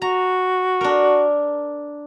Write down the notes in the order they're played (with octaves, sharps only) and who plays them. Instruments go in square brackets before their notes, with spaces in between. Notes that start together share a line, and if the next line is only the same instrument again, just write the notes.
[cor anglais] F#4 [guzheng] A#5
[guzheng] D4 A#4